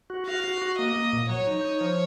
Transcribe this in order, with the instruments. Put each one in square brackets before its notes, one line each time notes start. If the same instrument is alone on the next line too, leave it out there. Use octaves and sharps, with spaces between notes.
[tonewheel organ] F#4
[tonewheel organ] F#4 [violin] F5
[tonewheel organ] F#4
F#4
[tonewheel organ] A#3 [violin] D#5
[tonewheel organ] A#3
A#2
[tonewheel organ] F#3 [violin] C#5
[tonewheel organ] D#4
D#4
F3